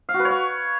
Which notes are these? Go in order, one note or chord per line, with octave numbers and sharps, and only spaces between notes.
F5
F#4
B4
C#5
F5